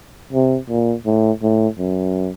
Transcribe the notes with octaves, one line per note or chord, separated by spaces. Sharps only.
C3
A#2
A2
A2
F#2